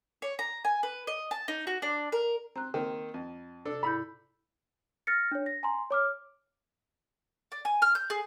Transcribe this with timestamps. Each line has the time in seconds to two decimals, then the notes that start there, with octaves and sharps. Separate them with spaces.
0.22 C#5
0.39 A#5
0.65 G#5
0.83 B4
1.07 D#5
1.31 A5
1.48 D#4
1.67 F#4
1.82 D4
2.12 A#4
2.56 C4 A#5 F#6
2.74 D#3 A#3 C4
3.14 F2
3.65 C3 D4 A4
3.83 G#2 E4 B5 G6
5.07 F6 A6 A#6 C#7
5.31 D4 C#5
5.46 A#6
5.63 G#5 A#5 C6
5.91 C#5 D6 F6
7.52 D5
7.65 G#5
7.82 F6
7.95 G6
8.10 G#4